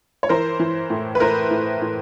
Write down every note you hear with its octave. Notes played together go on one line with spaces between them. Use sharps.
C#5
E3 A#4 C5
E3
A2
B4
A2 A#4 C5
A2
A2